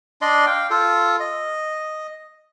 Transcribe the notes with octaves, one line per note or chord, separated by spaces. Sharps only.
D4 D5 D#5 C6
F5 G5
F4 A4
D#5